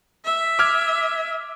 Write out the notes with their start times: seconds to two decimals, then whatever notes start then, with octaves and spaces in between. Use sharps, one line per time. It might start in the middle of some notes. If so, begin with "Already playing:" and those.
0.25 E5
0.59 D6 F6 G#6